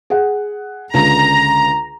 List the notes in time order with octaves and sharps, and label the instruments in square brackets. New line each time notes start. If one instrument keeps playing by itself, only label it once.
[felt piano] G#4 F#5
[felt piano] C#2 D3 [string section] A#5